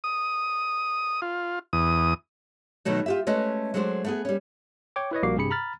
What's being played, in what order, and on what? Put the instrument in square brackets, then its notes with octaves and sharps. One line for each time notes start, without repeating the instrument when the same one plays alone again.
[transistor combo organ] D#6
F4
E2 D#6
[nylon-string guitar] B2 D#3 F#3 A3
F4 G4 E5
G#3 A3 C#4 B4 D#5
F#3 G#3 A3 D4 C5
A3 B3 G#4
G3 C#4
[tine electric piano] C#5 G5 D6
E4 B4 C#5 D#5
A#1 G3 A#3 F#4 D6 C7
G2 C3 G4 G#4 B5 C#7
A#5 B5 F6 A6